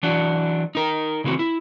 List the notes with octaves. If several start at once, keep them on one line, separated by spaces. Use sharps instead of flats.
E3 F#3 D4 F#4
D#4 A#4
C#3 E3 C4 F#4
E4